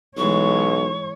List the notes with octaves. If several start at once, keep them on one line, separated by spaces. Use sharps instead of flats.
B1 E3 G#3 C#5 C#6